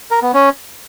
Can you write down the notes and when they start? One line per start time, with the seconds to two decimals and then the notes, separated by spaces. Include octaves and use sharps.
0.11 A#4
0.22 B3
0.34 C#4